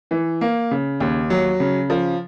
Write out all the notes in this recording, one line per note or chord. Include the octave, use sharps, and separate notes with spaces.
E3
A#3
C#3
D#2
F#3
C#3
F3